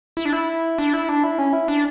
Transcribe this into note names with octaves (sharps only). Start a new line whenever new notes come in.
E4
D4
E4
D4
E4
D4
E4
C#4
E4
D4